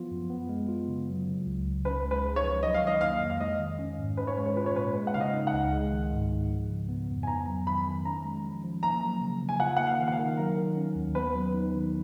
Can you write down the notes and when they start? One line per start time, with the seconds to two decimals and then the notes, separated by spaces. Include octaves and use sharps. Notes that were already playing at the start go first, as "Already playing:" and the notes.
Already playing: F3 B3 F4
0.11 F#2
0.30 B3
0.49 G#3
0.69 F4
0.88 C#3
1.08 F#3
1.27 C#3
1.47 C#2
1.65 C#2
1.85 C#4 B4
2.05 G#3
2.11 B4
2.24 G#4
2.36 C#5
2.43 F3
2.63 F#3 D#5
2.74 F5
2.82 D#3
2.87 D#5
3.01 A#3 F5
3.21 F2
3.30 F5
3.40 G#3 D#5
3.59 D#3
3.79 C#4
3.99 G#2
4.17 C#4 B4
4.27 C#5
4.37 G#3 B4
4.46 C#5
4.57 F4 B4
4.66 C#5
4.76 A#2 B4
4.95 G#3
5.07 F#5
5.14 C#3 F5
5.21 D#5
5.34 D#4
5.47 F#5
5.53 C#2
5.73 G#3
5.93 D#3
6.12 G#2
6.32 G#2
6.50 F3
6.70 C#3
6.89 B3
7.08 F2
7.23 G#5
7.27 B3 A#5
7.47 F#3
7.67 D#3 B5
7.86 D#3
8.05 C#4 A#5
8.24 G#3
8.45 F3
8.64 F3
8.83 A#3 A#5
9.02 F#3
9.21 C#3
9.42 C#3
9.49 G#5
9.60 F4 F#5
9.77 A#3 F#5
9.87 F5
9.99 D#3
10.08 F#5
10.12 F5
10.19 D#3
10.37 F#3 A#4
10.57 D#3
10.76 C#4
10.96 D#2
11.15 B3 B4
11.35 F#3
11.54 D#4
11.74 D#3